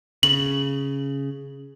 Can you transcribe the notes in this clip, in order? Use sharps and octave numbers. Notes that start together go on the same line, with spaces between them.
C#3 F#7